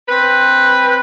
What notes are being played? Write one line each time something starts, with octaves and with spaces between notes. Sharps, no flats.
C4 B4